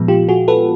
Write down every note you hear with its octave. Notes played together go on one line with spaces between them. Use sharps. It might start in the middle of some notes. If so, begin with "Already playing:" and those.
Already playing: A#2 F3 G#3 B3
F4 G4
F#4 G#4
A4 B4